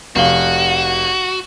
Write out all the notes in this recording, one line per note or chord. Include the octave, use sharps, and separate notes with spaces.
F1 F#4 F5 G7